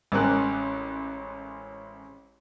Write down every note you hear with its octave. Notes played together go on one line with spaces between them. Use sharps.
A1 G#3 C4 C#4 A#4 F#6